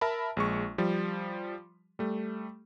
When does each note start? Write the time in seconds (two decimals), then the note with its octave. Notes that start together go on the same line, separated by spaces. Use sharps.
0.01 A#4 E5 A5 B5
0.37 A#1 G#3 C#6
0.78 F3 G3
1.99 G3 A3